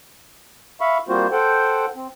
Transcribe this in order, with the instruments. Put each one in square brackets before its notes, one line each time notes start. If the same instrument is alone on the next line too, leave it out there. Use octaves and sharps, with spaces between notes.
[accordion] E5 F5 B5 C#6
G3 A#3 C4 F4 F#4 C5
A4 C5 F#5 G5
C4